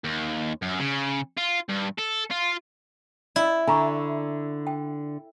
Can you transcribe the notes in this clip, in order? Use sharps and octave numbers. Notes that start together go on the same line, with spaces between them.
D#2
F#2
C#3
F4
G2
A4
F4
E4 D5 D#5
D3 G#5 A#5 C#6
G5